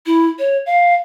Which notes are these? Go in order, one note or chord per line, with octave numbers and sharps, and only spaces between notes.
E4
C#5
F5